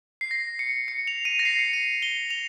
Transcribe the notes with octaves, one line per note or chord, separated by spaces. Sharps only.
C7
A#6
C#7
C#7
F7
D#7
A#6
C7
C#7
D#7
G7
F7